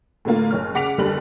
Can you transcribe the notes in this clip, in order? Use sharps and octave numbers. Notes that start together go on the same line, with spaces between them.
A2 D3 A#3 F4
F#1 C#5 F6
C#3 F#5 D6 B6 F7
F#1 D#2 D3 G3 B5 F#7